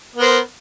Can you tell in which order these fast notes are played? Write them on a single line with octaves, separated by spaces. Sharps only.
B3 A#4 C5